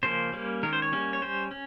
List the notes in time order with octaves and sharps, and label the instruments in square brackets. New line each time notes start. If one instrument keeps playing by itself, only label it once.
[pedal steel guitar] C#3 F3 A#3 C#4 C5
G3 A#3 C#4
D#3 G#3 C#4 A#4
C5
C#5
G3 A#3 C#4
C#5
G3 C#4 C5
C#4